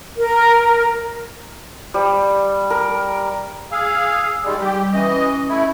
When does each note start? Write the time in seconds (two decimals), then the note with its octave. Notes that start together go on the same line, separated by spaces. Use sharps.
0.16 A#4
1.94 G3
2.70 A#4
3.72 G#4 F5 E6
4.45 D#3 G3 G#3
4.60 G3 G4
4.93 E3 C#4 D#5
5.49 A3 E4